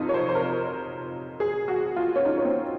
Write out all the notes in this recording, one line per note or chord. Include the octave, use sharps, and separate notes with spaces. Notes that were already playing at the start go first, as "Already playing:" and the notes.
Already playing: F2 C3 D#4 F4
C#5
C5
C5
A#4
G#4
F#4
F4
C#4
D#4
C#4
C4